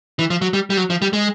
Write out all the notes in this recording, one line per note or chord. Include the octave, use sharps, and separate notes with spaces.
E3
F3
F#3
G3
G3
F#3
F3
G3
G#3